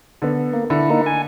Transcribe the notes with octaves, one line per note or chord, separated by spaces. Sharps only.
D3 B3
A#3
D3 E4
A#3 D#4
G#5